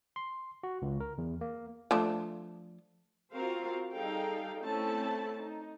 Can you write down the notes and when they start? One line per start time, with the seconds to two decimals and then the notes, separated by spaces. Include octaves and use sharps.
0.16 C6
0.63 F#4
0.82 C#2
1.00 A#4
1.18 E2
1.41 A#3
1.91 F3 A3 D4
3.32 C4 F4 F#4 A#4 C5 F5
3.92 G3 D#4 G#4 A4 F5 G5
4.62 A3 C4 C#4 E4 A4 A5
5.40 D#4